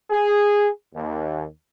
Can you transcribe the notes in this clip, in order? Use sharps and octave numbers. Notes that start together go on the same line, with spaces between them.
G#4
D#2